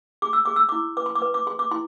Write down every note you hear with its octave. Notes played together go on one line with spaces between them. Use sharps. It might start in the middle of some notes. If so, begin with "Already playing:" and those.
G#4 D6
E6
G#4 D6
E6
E4 D6
B4 D6
C6
D6
B4
D6
G#4 C6
D6
E4 C6